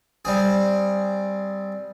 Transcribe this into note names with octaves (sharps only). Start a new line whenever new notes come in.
G3 C4 G#4